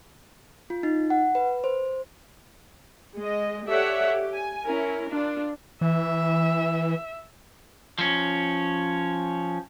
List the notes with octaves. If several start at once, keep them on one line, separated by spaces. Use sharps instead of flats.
F4
D#4
F#5
B4
C5
G#3 D#5
G4 A4 C#5 D5 E5 F#5
G4
G#5
C#4 E4 A#4
D4 F4
E3 E5
F3 C#4